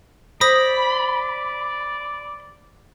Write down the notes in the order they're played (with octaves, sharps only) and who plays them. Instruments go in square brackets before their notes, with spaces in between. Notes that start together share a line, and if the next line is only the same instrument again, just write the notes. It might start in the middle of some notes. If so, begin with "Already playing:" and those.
[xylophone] C5 D#6 A#6 [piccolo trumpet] D5 [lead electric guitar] B5